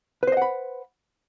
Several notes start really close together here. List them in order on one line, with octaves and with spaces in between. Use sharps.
B4 C5 D#5 F#5 B5